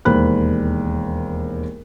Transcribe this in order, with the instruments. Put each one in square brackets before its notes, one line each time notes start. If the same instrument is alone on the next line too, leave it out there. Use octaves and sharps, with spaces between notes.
[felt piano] E1 D#2 C5 B5 F#6